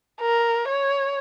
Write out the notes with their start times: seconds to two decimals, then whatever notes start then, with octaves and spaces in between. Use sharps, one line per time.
0.21 A#4
0.68 C#5